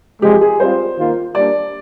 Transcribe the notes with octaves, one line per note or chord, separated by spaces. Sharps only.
C3 F3 G#3 G4
G#4
G3 C4 F4 C5
D#3 A#3 F4
G3 A#3 D4 D5